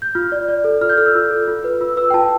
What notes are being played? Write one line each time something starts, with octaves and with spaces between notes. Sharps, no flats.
G6
F4 F6
D5
D5
A4
F4 F6
G6
A4 F6
E6
F4
A4
F4
B4
F4 E6
B4 E6
G5
F4 A5